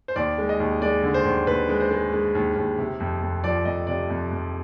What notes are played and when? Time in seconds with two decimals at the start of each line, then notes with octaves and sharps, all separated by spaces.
0.08 C5
0.16 D#2 D5
0.38 G#3
0.49 D#5
0.60 D#2
0.81 G#3 D5
1.03 D3
1.14 C5
1.25 D#2
1.47 D#2 B4
1.69 G#3
1.80 C5
1.91 G#3
2.12 G#3
2.35 D#2
2.56 D#2
2.78 C3
3.00 F2
3.22 F2
3.44 F3 D5
3.65 F2 D#5
3.87 C3 D5
4.10 F2
4.31 F2